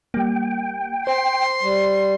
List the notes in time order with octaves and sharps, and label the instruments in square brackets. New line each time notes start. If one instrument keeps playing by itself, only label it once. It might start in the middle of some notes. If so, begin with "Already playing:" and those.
[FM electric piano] G3 A#3 [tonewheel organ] G5
[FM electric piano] C5 [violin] C6
[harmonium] G3